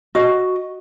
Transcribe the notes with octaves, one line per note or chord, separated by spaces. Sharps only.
F#4 D#5